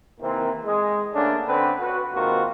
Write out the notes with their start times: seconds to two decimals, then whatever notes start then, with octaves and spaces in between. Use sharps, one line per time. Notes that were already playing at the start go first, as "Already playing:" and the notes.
0.21 C3 D#3 E3 A#3 C4
0.65 G#3
1.15 D3 A3 A#3 C#4 D4
1.47 D3 C4 C#4 B4
1.80 F#4 B4
2.13 G#1 C3 D#3 A#3 F4 F#4